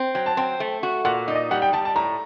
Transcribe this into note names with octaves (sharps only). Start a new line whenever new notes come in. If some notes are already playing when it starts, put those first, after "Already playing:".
Already playing: C4
F#3 G5
A5
C4 G5
A3
F#4
A#2 F#5
D#4 D5
D#5
G3 F#5
G5
G3 A5
A5
A2 A#5